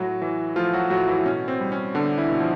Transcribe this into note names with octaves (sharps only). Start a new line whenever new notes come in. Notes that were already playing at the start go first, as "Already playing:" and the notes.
Already playing: A2 F#3 F#4
E3
F3 A3 F4
F#3 F#4
A2 F#3 F#4
E3 E4
B2 C#4
C4
G3
C#4
D3 B3 D4
E3 E4
B2
F3